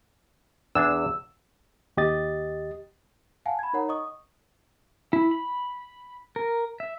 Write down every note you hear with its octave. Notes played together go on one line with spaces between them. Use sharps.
E2 D4 G#4 E6
D#2 G4 D#5 A6
F5 F#5 G#5 A5
B5 G#6
D#4 A#4 C#5 F#5 A#5
D#5 C#6 D#6
E4
B5
A#4
E5